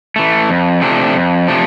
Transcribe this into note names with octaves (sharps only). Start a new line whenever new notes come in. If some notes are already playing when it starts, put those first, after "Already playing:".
E3 A3
F2
C3 F3 A3 D4
F2
C3 F3 A3 D4